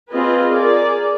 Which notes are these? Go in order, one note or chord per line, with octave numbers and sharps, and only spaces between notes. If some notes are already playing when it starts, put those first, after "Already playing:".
C4 F4 G#4 B4 D#5
G#4 A#4 D5